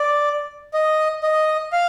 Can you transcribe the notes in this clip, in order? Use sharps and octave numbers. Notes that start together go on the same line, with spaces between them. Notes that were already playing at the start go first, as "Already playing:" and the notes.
Already playing: D5
D#5
D#5
F5